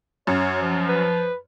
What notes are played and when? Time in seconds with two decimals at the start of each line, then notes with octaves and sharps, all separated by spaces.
0.27 F#2 C#5
0.62 F3
0.88 B4